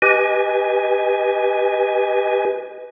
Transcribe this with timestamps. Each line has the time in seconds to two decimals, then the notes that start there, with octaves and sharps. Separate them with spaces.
0.02 G4 B4 D#5 G#5